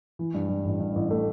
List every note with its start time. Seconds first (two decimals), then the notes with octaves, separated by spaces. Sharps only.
0.19 E3
0.34 G2
0.49 G2
0.65 A1
0.80 G2
0.96 A1
1.10 A3